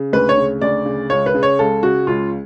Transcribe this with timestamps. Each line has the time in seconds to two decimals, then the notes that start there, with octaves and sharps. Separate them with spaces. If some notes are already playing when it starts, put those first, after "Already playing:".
Already playing: C#3
0.13 D2 B4
0.29 C#5
0.37 C#3
0.61 D2 D5
0.86 C#3
1.10 C#2 C#5
1.26 B4
1.35 C#3
1.43 C#5
1.59 C#2 A4
1.83 C#3 F#4
2.07 C#2 F4